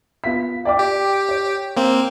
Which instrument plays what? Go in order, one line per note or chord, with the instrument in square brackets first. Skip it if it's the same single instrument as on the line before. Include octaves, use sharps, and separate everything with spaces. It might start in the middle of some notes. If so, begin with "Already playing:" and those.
[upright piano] B3 F4 B6
D5 G5 D6
[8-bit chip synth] G4
[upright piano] C#5
[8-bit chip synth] A#3 C4